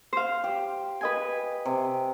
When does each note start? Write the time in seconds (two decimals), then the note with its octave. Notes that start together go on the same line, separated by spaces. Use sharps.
0.13 C5 F5
0.44 G4
1.01 B4 D#5 G#5
1.66 C3